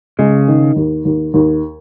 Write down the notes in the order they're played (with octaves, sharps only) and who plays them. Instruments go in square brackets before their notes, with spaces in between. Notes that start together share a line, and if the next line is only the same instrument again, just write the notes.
[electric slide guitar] C#3 [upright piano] G#3
[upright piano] D#3
D#2
D#2
D#2